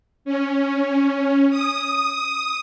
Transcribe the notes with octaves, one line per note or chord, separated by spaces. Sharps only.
C#4
D#6